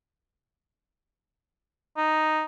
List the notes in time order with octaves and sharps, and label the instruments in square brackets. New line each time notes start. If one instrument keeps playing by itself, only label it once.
[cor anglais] D#4